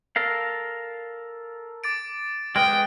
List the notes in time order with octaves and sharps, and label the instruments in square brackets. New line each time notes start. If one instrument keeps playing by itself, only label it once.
[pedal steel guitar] A4 A#4 F5
[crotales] D6 A6 D7
[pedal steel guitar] G#3 B4 D#6 [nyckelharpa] G5 [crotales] F6 D7